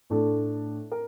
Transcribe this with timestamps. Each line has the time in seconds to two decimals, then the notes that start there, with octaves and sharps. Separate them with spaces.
0.10 A2 A3 D4 A4
0.91 A#4